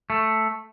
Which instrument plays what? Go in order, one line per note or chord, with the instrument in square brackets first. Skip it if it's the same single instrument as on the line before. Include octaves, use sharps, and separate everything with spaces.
[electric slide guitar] A3